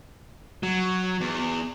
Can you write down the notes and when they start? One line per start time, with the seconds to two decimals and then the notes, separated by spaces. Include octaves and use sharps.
0.63 F#3
1.21 E2